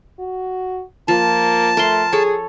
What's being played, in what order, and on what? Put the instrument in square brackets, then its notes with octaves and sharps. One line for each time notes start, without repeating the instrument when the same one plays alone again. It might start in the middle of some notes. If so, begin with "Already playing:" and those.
[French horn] F#4
[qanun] F3 [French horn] A#3 [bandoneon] A5
[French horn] A3 [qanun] A#4 C6
[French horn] G#4 [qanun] A4 C#5